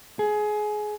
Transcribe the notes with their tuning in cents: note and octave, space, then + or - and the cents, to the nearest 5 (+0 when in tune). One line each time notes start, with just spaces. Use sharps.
G#4 +20